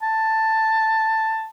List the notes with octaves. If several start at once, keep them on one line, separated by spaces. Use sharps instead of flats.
A5